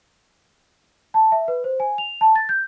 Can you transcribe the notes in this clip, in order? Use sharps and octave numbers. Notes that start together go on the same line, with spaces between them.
A5
E5
B4
C5
G#5
F7
A5
A6
G6